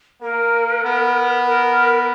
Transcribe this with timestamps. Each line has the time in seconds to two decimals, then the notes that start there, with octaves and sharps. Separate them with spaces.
0.21 A#3 A#4
0.84 B3
1.46 A#4